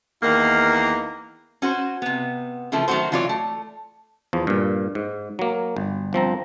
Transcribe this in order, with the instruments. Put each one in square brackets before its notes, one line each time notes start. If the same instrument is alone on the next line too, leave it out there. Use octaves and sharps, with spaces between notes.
[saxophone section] E2 D#3 A#3
[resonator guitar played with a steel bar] C#4 F#4 C5
C3 B3
C#3 E3 F3 A3
D#3 F#3 G#3 A3 F#4 C5
E3 F#3 F4 C#5 D5
A3
[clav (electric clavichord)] E2 F3
G2 A#2
G#2
F#3 A#3
G1
G1 F3 C4 A#5